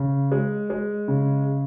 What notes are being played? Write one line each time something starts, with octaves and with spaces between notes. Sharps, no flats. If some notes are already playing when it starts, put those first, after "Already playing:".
Already playing: C#3
G#3
G#3
C#3